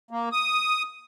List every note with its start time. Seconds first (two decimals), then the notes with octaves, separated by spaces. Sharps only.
0.11 A#3
0.32 D#6